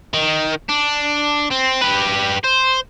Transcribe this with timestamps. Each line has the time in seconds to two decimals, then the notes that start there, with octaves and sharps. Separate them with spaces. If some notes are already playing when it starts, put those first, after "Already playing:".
0.13 D#3
0.69 D4
1.51 C4
1.82 G4 B4
2.44 C5